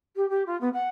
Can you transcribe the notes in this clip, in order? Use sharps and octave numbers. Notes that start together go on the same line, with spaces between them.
G4
G4
F4
B3
F#5